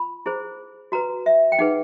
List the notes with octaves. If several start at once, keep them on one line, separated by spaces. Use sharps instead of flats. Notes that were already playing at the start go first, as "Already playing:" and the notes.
Already playing: F4 B5
E4 G#4 C5
F#4 B4 A#5
E5
G5
D#4 G#4 B4 F#5